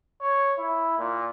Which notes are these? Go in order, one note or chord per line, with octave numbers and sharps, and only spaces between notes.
C#5
E4
A#2